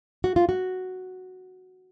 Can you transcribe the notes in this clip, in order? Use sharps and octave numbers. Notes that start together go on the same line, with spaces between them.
F#4
F4
F#4